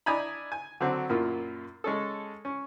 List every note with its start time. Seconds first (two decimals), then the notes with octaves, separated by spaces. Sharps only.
0.06 D4 E4 D#5 G#5 A#5 B5
0.52 G#5
0.80 D3 F#3 C4 F#4
1.09 F#2 A#2 A#3 E4 F4
1.84 G#3 C#4 A4
2.45 C#4